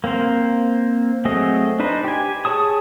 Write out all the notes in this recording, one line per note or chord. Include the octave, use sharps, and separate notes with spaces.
A#3 C4 A#4 C5
F#3 A3 C4 G#4 D#5
D4 D#4 B4 C5
G4 G#5
G#4 C#5 A5 D#6